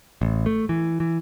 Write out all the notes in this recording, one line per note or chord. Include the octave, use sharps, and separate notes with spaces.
A1
A3
E3
E3